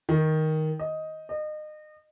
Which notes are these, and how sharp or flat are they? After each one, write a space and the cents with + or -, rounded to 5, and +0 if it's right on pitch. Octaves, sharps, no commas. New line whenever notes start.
D#3 +5
D#5 +10
D#5 -30